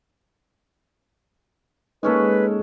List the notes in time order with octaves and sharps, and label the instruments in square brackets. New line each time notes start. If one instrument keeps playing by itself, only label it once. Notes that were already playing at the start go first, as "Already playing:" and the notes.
[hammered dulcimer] G#3 C#4 A4 [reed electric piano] A#3 D#4 [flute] B4